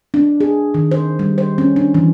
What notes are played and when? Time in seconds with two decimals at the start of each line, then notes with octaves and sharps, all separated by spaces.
0.14 D4
0.41 G#4
0.74 D#3
0.91 C5
1.19 G3
1.38 C5
1.58 C#4
1.76 D4
1.95 E3